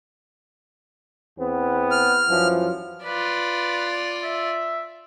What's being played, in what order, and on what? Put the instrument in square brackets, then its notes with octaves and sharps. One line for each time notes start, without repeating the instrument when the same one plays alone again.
[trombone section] E2 B3 C4
[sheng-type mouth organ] F6
[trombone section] F#2 E3 F3
[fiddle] F4 D5 [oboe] B4
[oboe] E5